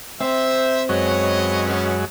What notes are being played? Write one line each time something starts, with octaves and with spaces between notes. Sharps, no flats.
C4 C5 E5
F#2 F#3 G#3 B4 C#5 D#5
B2 C#4